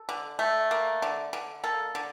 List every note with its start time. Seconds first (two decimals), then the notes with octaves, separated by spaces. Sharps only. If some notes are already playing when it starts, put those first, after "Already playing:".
Already playing: A4
0.09 D3
0.39 A3
0.71 A#3
1.02 D3
1.33 D3
1.63 A#3 A4
1.95 D3